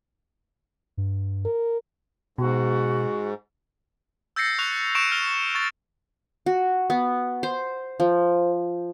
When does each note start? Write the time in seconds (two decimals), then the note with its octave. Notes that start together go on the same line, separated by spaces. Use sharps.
0.97 G2
1.45 A#4
2.38 G#2 B2 F#4
4.36 E6 G6 A6 A#6 C7 C#7
4.58 C#6 F#6 F7
4.95 C#6 G6 C#7 D7 E7
5.11 F6 F#6 F7 G7
5.55 C#6 A6
6.46 F#4
6.90 B3
7.43 C5
8.00 F3